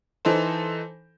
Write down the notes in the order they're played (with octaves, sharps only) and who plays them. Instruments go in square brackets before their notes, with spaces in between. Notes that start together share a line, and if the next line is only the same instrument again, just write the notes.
[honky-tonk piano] E3 D#4 A4 C5